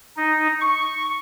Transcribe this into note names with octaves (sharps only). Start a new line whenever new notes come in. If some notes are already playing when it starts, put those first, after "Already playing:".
D#4
C#6